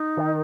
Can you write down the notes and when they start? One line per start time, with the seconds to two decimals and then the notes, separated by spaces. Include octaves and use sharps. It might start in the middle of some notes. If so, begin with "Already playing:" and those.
Already playing: D#4
0.17 D#3